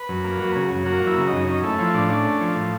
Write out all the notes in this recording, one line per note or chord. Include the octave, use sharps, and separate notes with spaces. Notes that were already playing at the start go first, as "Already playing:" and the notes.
Already playing: B4
F#2
A#3
F#3
C#3
F#2
A#3 F#4
F#3
E4
C#3
D#4
F#2
C#4 D#4
A3 E4
F3 E4
A2 D4
C#4 D4
A3
F3
A2